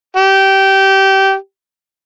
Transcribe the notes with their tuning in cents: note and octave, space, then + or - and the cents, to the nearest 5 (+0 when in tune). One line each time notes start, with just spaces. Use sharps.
G4 -20